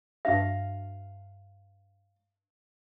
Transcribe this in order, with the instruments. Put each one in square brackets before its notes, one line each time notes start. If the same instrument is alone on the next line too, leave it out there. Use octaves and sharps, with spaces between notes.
[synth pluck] G2 D4 F#4 [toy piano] E5 [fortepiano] F5